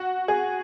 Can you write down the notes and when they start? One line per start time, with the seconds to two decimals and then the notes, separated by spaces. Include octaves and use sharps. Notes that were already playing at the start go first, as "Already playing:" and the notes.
Already playing: F#4
0.28 G#4